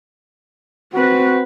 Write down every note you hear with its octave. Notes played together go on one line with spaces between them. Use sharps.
C4 F#4 B4